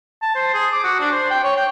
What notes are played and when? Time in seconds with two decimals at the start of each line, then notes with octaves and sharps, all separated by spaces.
0.22 A5
0.35 C5
0.54 G#4
0.73 D6
0.84 F#4
1.00 D4
1.12 C5
1.31 G5
1.44 C#5
1.57 G5